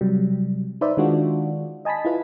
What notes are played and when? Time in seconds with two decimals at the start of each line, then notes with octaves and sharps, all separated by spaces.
0.01 C3 F#3 G3
0.81 D#4 B4 C5 D5 E5
0.97 D#3 G#3 D4 F4 F#4
1.85 D#5 G#5 A5 B5 B6
2.05 E4 F4 B4